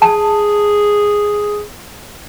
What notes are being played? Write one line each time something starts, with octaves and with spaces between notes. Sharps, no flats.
G#4 A5